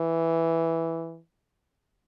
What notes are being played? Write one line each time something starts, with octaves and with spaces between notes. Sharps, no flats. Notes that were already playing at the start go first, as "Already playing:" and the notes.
Already playing: E3